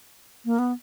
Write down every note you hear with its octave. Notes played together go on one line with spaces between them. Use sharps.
A#3
B3